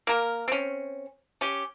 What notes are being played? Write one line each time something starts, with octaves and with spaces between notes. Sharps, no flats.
A#3 A#4
C4 C#4
C#4 G4